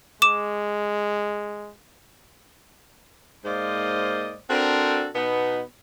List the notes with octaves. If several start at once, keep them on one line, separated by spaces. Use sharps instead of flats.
G#3 D6 E7
G#2 A#3 C5 D5 D#5 F5
C4 D4 F#4 A4 A#4 C5
B2 B3 D#4